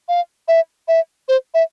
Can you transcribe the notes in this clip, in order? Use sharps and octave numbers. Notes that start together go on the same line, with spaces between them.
F5
E5
E5
C5
E5